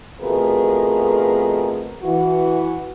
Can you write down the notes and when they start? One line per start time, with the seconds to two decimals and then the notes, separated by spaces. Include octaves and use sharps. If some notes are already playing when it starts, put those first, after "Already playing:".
0.20 F2 B2 A3 G#4 A#4 B4
2.02 E3 F#4